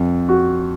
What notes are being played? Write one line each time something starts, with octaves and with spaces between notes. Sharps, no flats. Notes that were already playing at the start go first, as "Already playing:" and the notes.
Already playing: F2
F#4